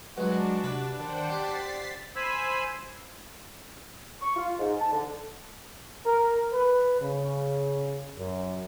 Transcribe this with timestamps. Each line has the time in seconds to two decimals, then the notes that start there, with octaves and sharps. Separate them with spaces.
0.17 F#3 G#3 D4 F#4 B4
0.64 C3 B4
1.00 D#3 D4 C5 F#5 G5
1.29 G4 D5 A6 B6 C7
2.16 C5 G#5 B5 E6
4.22 C#6
4.36 F4
4.59 G#2
4.80 A5
4.92 D3
6.05 A#4
6.52 B4
7.02 C#3
8.17 F#2